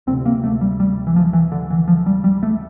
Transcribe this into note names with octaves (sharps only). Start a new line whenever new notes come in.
D2 C3 C4
A#3
A3
G3
G3
E3
F3
E3
D3
E3
F3
G3
G3
A3